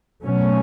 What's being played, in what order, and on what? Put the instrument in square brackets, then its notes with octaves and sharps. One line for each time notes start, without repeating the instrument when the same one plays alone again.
[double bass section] B2 F#3 A3 C#4